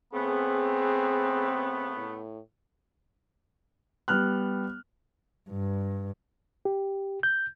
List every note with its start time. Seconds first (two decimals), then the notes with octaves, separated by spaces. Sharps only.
0.14 C#3 A3 B3 C4 G#4
1.97 A2
4.08 G3 B3 F6 F#6
5.49 G2
6.65 G4
7.23 G6